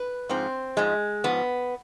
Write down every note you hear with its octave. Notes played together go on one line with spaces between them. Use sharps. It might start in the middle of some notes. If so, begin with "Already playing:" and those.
Already playing: B4
G#2 F3 C4
G#2 F3 G#3
G#2 F3 B3